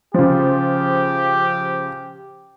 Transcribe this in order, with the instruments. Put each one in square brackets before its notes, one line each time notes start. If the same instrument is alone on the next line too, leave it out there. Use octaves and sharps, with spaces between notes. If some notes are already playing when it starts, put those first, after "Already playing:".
[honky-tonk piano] C#3 F3 [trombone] G4